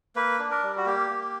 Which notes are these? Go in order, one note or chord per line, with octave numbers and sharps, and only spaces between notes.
A#3 B4
D4
A#4
G3
F#4
A#3 G4
A#3